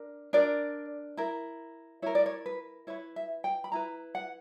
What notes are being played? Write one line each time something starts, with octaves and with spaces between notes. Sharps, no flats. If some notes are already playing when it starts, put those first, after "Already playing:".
Already playing: D4 A#4
D4 A#4 D5
E4 A#4
E4 A#4 C#5
D5
C#5
B4
E4 B4 C#5
E5
G5
B5
E4 B4 A#5
F#5